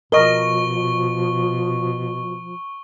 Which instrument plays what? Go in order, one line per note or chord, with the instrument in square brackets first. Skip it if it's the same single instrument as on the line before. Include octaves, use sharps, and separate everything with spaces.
[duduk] B2 [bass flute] F3 [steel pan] A#4 D#5 [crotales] C#6 G7